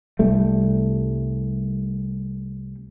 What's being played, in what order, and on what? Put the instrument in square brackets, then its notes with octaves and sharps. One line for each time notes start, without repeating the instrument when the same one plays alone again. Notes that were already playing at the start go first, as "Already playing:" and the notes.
[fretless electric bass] C2 G3 A3